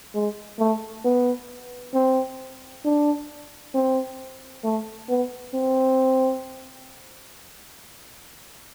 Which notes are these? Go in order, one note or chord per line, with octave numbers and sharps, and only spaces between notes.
G#3
A3
B3
C4
D4
C4
A3
B3
C4